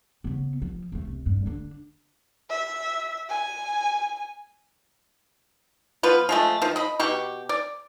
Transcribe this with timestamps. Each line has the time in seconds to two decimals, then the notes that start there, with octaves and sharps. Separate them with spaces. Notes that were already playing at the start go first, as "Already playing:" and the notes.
0.24 C#3 B3
0.62 F3
0.92 C2 A3
1.07 C2
1.26 G2
1.46 D3 D4
2.50 E5
3.30 G#5
6.03 F3 B3 F4 B4
6.29 F3 G#3 A3
6.62 D#3 F3
6.76 D#5 B5
7.00 B2 G4 C#6
7.49 D5